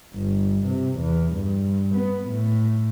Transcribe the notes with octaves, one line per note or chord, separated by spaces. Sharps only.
G1
C3
E2
G2
B3
A2